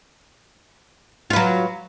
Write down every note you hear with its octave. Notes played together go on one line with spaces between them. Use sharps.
F#3 F4 B4